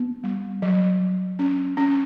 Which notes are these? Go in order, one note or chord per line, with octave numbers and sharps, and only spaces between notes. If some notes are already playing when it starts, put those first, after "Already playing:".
Already playing: B3
G3
F#3
F#3
C#4
C#4